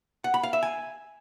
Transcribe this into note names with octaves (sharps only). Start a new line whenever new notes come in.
F#5
B5
F5
E5
G#5